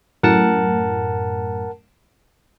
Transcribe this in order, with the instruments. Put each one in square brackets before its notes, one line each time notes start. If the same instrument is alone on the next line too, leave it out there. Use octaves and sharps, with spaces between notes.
[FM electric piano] F#2 A2 [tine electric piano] A#4 F#5 A5